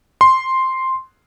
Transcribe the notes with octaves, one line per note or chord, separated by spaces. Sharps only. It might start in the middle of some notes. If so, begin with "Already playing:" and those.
C6